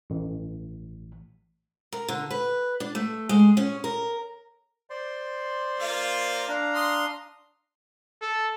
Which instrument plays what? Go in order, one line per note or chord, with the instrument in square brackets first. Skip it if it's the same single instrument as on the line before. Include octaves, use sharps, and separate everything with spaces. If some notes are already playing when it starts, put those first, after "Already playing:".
[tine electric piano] A1
[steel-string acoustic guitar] A#4
D3
B4
D4
A3
G#3
C#4
A#4
[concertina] C5 D5 C6
[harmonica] A#3 F4
[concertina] D4 F5 A#5
[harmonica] C6 D#6
[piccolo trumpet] A4